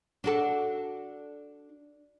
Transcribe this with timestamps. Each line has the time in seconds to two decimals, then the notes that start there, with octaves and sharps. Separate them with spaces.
0.24 D4 F#4 A4